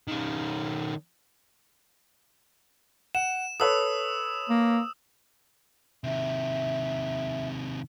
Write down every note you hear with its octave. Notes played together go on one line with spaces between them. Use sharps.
D#3 C#4
F#5 E7
A4 B4 C#5 D#6 E6
A#3
C3 D#3 E5